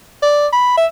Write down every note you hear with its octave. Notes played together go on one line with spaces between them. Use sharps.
D5
B5
E5